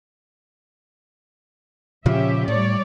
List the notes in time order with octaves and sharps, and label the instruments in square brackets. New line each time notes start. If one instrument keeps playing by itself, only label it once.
[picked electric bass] A#2 C#3 F3 [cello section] C#4 G4 E5
[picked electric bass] A2 [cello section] G3 C#5 D5